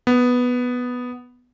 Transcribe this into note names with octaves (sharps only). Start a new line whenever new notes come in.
B3